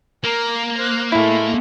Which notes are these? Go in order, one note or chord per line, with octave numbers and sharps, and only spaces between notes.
A#3 A#4
C5 F#6
A2 G#3 A3 E4